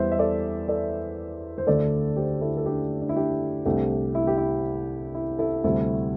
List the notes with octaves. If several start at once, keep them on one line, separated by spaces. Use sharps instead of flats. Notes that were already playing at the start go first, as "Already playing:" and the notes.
Already playing: E2 E3 G3 C5 E5
E5
A4 D5
A4 D5
C5
D2 D3 A3 A4 D5
G4 C5
E4 A4
A4
D4 G4
D4
E4
D4 G4
C2 C3 A3 D4 G4
E4
G4
E4
E4
E4 A4
D2 C3 G3 E4 A4